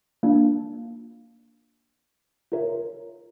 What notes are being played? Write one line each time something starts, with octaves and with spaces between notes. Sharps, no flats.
A#3 D4 F4
F4 A#4 C#5 E5